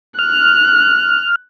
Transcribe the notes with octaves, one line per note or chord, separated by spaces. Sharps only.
F6 F#6